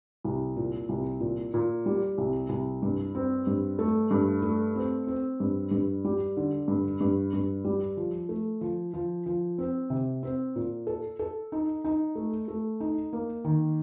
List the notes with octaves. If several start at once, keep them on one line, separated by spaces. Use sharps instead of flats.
C2
A#2
C2
A#2
A#2
G3
C2
C2
G2
C4
G2
A3
G2
A3
C4
C4
G2
G2
G3
D3
G2
G2
G2
G3
F3
A3
F3
F3
F3
C4
C3
C4
A#2
A4
A4
D#4
D#4
A3
A3
D#4
A#3
D#3